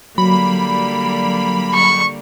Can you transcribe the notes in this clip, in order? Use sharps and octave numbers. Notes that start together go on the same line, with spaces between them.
D3 F#3 G3 A#3 B5
C#6